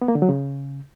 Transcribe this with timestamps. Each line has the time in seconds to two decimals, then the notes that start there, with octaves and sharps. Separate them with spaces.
0.02 B3
0.08 A#3
0.15 D3
0.22 F#3
0.29 C#3